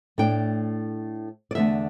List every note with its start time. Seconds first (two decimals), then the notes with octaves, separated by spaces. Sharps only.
0.18 A2 A3 D4 G5
1.51 D5
1.55 E2 D3 A3 D4 E5